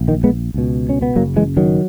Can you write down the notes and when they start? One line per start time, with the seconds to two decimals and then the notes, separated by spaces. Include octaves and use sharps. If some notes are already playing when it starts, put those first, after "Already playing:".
Already playing: A#1
0.08 D#3
0.24 G#3 B3
0.54 C#2 B2
0.89 C#4
1.02 B3
1.16 F#1 F#2 C#3 F#3 A#3
1.36 E3 G#3
1.57 D#3 F#3